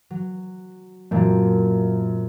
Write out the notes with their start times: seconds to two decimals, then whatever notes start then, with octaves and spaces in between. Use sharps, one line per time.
0.10 F#3
1.11 F#2 A#2 F3 F#3 A3 C4